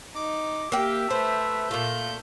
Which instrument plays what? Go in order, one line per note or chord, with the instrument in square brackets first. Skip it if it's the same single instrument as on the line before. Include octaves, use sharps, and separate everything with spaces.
[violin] D#4 [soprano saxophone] D6
[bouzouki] A#3 G5 [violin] G4 [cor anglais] E5
[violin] A3 [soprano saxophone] B4 [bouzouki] C5
[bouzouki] A#2 A3 [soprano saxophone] F4 [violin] G6